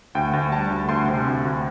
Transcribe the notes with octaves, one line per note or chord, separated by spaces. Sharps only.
D2 G5
D2
G3 A5
D2
D2 C6
C3
D2
D2